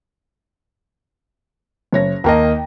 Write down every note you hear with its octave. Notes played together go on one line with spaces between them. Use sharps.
F#1 C#5 A#6
D#2 A#3 D#5 G5 A5 A#5